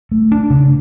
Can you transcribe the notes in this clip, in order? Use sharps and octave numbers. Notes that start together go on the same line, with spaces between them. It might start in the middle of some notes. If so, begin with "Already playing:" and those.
A3
D4
C#3